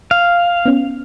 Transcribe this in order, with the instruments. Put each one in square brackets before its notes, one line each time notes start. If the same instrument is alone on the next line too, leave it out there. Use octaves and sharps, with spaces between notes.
[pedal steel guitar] F5
[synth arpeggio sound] B3 C#4